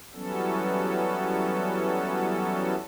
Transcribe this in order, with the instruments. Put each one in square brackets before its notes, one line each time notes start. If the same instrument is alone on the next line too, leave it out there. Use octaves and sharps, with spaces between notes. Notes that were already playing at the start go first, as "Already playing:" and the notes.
[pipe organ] E3 F#3 G3 B3 C#4 A4